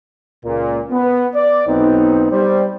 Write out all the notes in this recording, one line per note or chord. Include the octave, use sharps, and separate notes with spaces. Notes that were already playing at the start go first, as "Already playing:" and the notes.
C#2 A#2
B3
D5
B1 B3 C4 D#4
G3 C5 D5